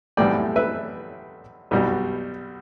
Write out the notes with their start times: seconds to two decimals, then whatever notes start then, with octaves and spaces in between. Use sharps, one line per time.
0.17 B1 A2 E3 G3 D5 G5
0.56 B4 E5
1.71 B1 B2 G3